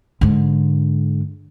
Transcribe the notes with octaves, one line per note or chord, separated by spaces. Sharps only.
G#2 D3